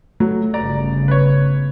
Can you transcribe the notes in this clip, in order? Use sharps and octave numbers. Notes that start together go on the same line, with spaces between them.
F#3 A3
G1 C#3 D5 A#5
B4 C#5